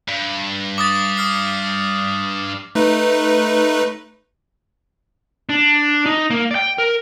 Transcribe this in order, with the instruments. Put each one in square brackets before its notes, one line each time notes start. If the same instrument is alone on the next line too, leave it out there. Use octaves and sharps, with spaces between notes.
[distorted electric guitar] G2
[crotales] D6 D#6 A6
D#6 F6 C7
[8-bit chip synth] A3 D#4 B4
[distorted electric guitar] D4
D#4
A#3
D5 G5
A#4